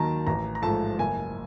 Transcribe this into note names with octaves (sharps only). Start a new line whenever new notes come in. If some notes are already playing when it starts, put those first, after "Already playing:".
Already playing: D#2 D#3 F#3 A5 A#5
A1 A#5
A#5
G#2 F3 A3 A5
F#1 G#5